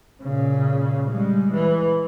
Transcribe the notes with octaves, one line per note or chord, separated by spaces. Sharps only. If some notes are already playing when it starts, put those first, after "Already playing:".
A#2 C#3
G3 G#3
E3